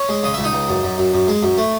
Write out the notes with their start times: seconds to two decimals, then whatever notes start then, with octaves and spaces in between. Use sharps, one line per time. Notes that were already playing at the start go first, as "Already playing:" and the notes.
Already playing: C#4 C#5
0.09 G#3
0.23 C#3 D#5
0.34 C#2 E5
0.44 D#4 D#5
0.53 C#2
0.69 F#2
0.83 F#2
0.98 F#2
1.14 F#2
1.28 G#3
1.43 F#2
1.58 A3